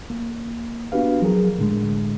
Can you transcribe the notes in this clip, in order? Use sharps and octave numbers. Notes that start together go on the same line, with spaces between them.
A#3
B3 D4 F#4 G4 B4 F5
F3 F#3 G#4 A#4
A2 D3 G#3